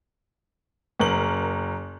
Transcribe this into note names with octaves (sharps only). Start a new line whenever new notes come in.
F#1 A#4 F#7